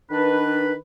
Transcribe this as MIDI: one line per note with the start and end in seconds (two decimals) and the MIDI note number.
0.11 0.74 51
0.11 0.74 62
0.11 0.74 71